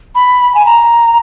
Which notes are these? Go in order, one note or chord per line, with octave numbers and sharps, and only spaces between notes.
B5
G#5
A#5